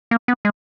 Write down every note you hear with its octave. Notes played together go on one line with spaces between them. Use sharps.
A#3
B3
G#3